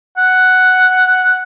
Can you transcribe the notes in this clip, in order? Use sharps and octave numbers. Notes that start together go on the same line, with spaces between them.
F#5